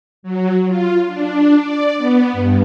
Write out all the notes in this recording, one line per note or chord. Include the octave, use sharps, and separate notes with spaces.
F#3
F4
D4
D5
B3
G2